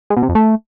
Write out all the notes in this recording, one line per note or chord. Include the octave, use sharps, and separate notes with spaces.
G#3
B2
C3
F2
A3